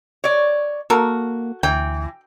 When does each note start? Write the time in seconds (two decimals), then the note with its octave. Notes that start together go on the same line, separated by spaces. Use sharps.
0.24 C#5 D5
0.90 A#3 F#4 A4 A#4
1.63 D2 E3 G5